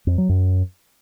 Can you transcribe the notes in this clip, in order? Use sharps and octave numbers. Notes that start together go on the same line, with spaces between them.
F2
F#3
F#2